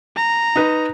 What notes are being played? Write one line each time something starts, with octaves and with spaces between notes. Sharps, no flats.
A#5
D#4 B4